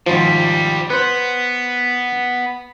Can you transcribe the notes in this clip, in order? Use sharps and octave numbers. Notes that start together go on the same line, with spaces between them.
G#1 C3 F3 G3
B3 B4 C5